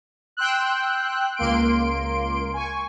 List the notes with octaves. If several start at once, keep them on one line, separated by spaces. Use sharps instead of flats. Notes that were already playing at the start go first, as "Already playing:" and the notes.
G5 C6 E6 F#6
C#2 A#3 C6 D7
G#5 C#6